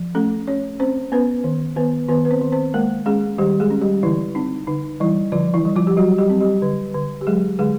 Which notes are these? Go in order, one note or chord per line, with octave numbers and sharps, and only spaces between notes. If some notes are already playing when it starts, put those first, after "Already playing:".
Already playing: F3
A3 C#4 A4
C#4 C#5
C4 C#4 C5
B3 C#4 B4
D#3
D#3 B3 B4
D#3 B3 B4
B4
C4 C5
D#3
C4 C5
G#3 A#3 A#4
G#3 C#4 G#4
D#3 G3 G4
G#3 G#4
C#4
G3 G4
D3 E3 E4
C4 D#4
D3 D#4
E3 G3 E4
D3 F3 F4
E3 E4
G3
F3 F4
G4
F#3 G3 F#4
G3 G4
C4
G3 G4
D3
D3
G4
F#3 G#3 G#4
D3 G#3 G#4